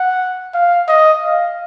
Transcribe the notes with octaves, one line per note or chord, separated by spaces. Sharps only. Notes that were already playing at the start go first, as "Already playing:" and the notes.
Already playing: F#5
F5
D#5
F5